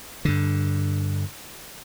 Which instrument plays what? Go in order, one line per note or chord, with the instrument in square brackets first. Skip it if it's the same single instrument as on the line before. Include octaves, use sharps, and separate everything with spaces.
[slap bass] G2 D3